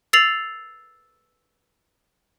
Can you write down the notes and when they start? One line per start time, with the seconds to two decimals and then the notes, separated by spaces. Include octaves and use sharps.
0.13 E6 A6 C7 F7 F#7